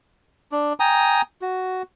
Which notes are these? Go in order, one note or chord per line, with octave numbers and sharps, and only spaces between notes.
D4
G5 G#5 A#5 D#6
F#4